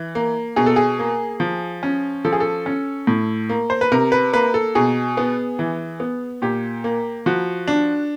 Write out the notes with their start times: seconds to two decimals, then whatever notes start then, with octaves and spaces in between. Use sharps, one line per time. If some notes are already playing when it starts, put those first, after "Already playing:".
Already playing: E3
0.15 A#3
0.56 B2 G#4
0.66 A4
0.76 G#4
0.99 A#3
1.40 F3
1.83 C#4
2.25 F3 A4
2.33 G#4
2.40 A4
2.66 C#4
3.07 A2
3.49 A#3
3.70 C5
3.81 B4
3.92 C3 A#4
4.12 B4
4.33 A#3 B4
4.54 A4
4.75 B2 G#4
5.17 B3
5.59 E3
6.00 B3
6.42 A#2 G4
6.84 A#3
7.26 F3 F#4
7.68 D4